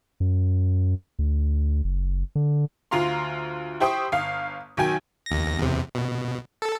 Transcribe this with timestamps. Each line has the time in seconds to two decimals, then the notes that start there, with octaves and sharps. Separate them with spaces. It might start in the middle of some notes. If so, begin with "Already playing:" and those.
0.20 F#2
1.19 D2
1.84 F#1
2.35 D3
2.91 D2 F4 F5 A#5 C6
3.80 E4 G4 C5 G5 C#6 D#6
4.12 G1 F5
4.77 B1 D#3 F#3 G5 G#5
5.26 D#2 A#6
5.58 E2 C3
5.95 B2
6.62 A4